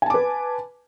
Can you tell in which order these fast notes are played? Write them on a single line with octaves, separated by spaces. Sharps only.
G#5 A5 D6 B4